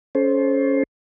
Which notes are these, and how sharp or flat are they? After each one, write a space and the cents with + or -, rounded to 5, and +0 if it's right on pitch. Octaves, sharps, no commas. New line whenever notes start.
C#4 +10 A4 -30 C5 +15